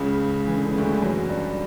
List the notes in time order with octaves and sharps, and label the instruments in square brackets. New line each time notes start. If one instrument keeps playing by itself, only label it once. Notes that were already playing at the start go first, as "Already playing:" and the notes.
Already playing: [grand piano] C#2 C#3
E3
D3
C#3
D2 D3
E3
F#2 F#3
G2 G3